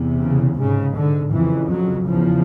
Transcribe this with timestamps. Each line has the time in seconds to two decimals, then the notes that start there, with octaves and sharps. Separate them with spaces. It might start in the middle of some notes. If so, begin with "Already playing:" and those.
Already playing: E2 C3
0.21 C#3
0.58 G#2 C#3
0.96 D3
1.32 F2 C#3 E3
1.69 F#3
2.06 E2 C#3 F3